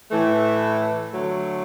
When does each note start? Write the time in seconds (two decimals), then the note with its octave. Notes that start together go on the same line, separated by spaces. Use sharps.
0.10 A2 E3 A3
1.12 D3 F#3 A3